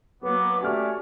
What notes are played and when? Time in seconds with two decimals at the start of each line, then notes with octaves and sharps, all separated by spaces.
0.23 F#3 A#3 B3 B4 D6
0.61 A3 C#4 F#4 G4 D5 F6